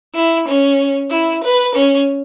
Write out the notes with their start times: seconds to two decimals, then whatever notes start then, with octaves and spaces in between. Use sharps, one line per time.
0.15 E4
0.48 C#4
1.10 E4
1.43 B4
1.75 C#4